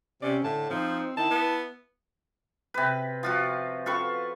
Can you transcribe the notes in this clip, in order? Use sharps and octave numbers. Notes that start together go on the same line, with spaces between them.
C3 C#4 D5
A2 D3 A5
F3 C4 D#4
D#3 E4 A5
B3
C3 B4
F3 F4 F#4
F4 A4 B4 C#6